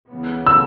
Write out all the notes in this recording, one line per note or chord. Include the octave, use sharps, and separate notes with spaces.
C#2 C#3 E3 B3
E6